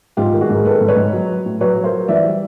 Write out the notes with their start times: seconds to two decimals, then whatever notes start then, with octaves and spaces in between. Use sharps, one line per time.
0.17 G#2 F4 G4
0.33 D#3
0.41 F#4 G#4
0.49 G#2 A#4
0.65 D#3 A4 B4
0.81 G#2
0.88 B4 C#5
0.96 G#2
1.13 F#3
1.29 F#3
1.45 A2
1.60 F#3 B4 C#5
1.76 F#3
1.84 A#4 C5
1.92 F#3
2.08 E3 D5 E5
2.24 G3